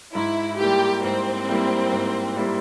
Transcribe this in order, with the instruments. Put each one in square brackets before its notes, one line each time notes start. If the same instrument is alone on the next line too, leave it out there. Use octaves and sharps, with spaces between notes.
[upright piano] G#2 [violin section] E4
[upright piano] G3 A#3 E4 [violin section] G4
[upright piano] G#2 [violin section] C4
[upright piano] G3 A#3 E4
G#2
G3 A#3 E4